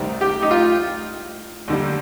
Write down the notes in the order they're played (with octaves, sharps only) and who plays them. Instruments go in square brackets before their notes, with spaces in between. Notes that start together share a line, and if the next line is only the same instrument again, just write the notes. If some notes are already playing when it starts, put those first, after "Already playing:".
Already playing: [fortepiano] C2 C3 D#3 G3
G4
D#4
F4
D#2 D3 G3